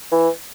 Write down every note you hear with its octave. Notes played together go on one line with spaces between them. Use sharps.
E3